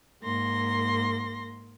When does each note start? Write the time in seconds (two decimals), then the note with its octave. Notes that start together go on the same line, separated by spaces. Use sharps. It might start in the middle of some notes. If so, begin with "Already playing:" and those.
0.21 G#2 A#3 C6 A#6